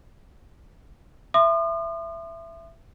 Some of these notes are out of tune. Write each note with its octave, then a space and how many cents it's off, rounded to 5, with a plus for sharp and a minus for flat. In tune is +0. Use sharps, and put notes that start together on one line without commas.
E5 +15 C6 -5 D#6 -45